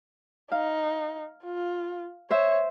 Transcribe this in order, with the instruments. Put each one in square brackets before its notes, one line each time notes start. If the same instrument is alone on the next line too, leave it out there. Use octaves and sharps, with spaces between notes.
[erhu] D#4 [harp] F5
[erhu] F4
[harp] C5 E5 [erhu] C#5